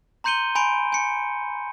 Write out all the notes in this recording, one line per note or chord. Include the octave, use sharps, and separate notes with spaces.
A#5 C6 G6 C#7 D#7 G7
G#5 B5 C6 D7
G#5 C#7